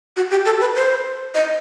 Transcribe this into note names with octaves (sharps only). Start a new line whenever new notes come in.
F#4
G4
A4
B4
C5
D#5